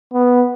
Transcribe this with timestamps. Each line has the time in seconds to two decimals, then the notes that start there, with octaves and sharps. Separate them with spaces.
0.13 B3